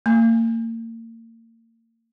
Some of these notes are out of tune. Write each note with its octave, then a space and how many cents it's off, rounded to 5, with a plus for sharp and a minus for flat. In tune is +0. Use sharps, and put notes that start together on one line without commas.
A#3 -35